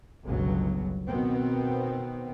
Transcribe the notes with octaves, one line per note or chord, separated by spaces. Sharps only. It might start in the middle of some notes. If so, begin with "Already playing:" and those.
G1 C#2 B2 F#3
B2 D#3 B3 C4